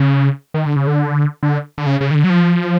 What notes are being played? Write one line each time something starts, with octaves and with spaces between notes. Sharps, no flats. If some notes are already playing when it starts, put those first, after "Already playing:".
Already playing: C#3
D#3
D3
C#3
D3
D3
D3
C#3
C#3
D#3
D3
F#3
F3